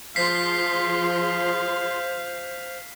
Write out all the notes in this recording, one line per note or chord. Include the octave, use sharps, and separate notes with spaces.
F3 G#4 C5 F5 C6 B6 C7